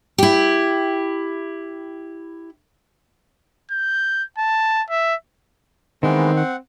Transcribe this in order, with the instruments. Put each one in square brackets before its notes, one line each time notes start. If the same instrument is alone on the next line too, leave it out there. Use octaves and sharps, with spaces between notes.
[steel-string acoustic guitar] E4 G4
[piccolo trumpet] G6
A5
E5
[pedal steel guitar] D#3 [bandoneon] E3 G#3 B3 [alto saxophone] C4
[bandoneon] F#5